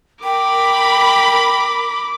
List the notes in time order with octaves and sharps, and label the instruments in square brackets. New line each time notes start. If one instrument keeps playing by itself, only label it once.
[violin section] A#4 B5 [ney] G5 [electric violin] D6